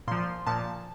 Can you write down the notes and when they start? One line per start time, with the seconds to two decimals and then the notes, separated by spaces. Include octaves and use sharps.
0.08 A#2 F3 C6
0.47 A#2 F3 A5